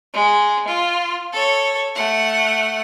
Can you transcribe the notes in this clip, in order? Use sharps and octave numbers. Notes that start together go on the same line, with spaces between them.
G#3
F4
A4 C#5
A3 F#5